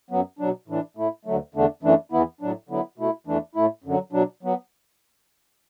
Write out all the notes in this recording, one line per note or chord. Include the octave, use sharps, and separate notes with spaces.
F#2 F#3 B3
B2 F#3 D4
A2 E3 D4
A2 A3 E4
D2 D3 F#3 A3
E2 D3 A3 D4
F#2 E3 A3 D4
E2 E3 B3 E4
A2 F#3 D4
D3 F#3 B3 E4
B2 A3 E4
E2 E3 A3 D4
A2 A3 E4
F#2 D3 F#3
B2 F#3 D4
F#3 B3